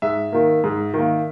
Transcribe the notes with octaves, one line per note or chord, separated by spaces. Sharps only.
G#2 E5
D#3 A#3
G#2
D#3 A#3